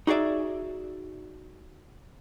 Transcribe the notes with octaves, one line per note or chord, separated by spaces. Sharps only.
D#4 F#4 G#4 D5 E5